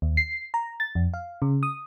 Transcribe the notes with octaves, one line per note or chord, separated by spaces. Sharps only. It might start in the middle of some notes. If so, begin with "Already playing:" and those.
D#2
C7
A#5
A6
F2
F5
C#3
D#6